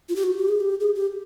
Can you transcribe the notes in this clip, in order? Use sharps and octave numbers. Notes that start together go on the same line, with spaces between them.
F4
G4
F#4
G4
G#4
G4
G#4
G4